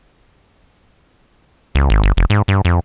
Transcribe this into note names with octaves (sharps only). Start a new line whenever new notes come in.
C#2
G#1
G1
F1
G#2
G2
F2